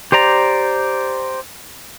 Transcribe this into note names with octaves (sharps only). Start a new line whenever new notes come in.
G4 C5 D5 A#5